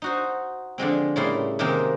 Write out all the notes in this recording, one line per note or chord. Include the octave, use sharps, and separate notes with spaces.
D#4 F#4 C5
D3 F3 G#3 C4
A2 C#3 G3 A#3 E4 C6
C3 D#3 G#3 A#3 C4